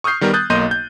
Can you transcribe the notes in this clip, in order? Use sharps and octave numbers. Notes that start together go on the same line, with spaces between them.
C#6 D#6 F6 G6 C7
D#3 G3 B3 A#4
D#6 F#6 G6 A6
B1 A#3 D#5 C6 G6 D#7
G6